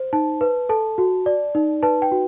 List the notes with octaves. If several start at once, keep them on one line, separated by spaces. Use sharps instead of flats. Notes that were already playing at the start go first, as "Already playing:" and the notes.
Already playing: C5
D#4 A5
B4
A4 A5
F#4
D5
D#4
B4 A5
G5
F#4